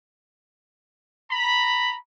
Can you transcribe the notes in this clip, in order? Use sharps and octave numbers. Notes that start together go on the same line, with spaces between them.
A#5 B5